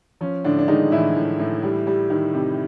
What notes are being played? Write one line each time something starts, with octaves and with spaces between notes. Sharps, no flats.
F3 C#4
A2 D3 D4
D4
D#3 G#3 D#4
A2 E3 E4
A2
A2
G3
G3
D#3
C3